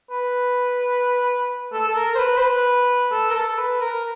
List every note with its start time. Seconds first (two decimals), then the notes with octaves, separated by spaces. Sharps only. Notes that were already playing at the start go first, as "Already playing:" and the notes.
0.11 B4
1.73 A4
1.87 A4
1.96 A#4
2.15 C5
2.19 B4
2.37 C5
2.42 B4
3.12 A4
3.31 A#4
3.35 A4
3.58 B4
3.81 A#4